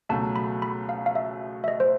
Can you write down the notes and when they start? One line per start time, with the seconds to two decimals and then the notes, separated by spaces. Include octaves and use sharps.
0.09 C#2 B2 F#3 A3 A5
0.36 B5
0.62 B5
0.89 F5
1.06 F5
1.15 E5
1.64 E5
1.68 D#5
1.80 C5